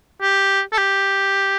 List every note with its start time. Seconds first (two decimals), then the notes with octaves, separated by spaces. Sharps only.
0.22 G4
0.72 A4
0.78 G4